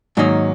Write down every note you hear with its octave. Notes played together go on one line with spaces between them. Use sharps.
G#2 D#3 F#3 A#3 D#4